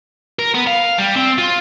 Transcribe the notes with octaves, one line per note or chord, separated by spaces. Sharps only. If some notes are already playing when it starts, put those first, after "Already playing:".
A#4
B3
F5
G3
C4
F4